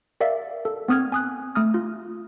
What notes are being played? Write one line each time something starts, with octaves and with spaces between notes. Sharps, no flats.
A#4 D5 E5 F5
A4
B3 C4 D#6 F6 G#6
G#5 D#6 F#6
A3 D#6 F6
F4